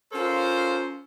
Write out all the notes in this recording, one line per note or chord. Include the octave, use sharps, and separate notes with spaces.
C#4 F4 A4 A#4 C5